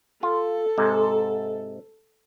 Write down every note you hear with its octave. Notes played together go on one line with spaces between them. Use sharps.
F4 A4
G#2 C3 G#3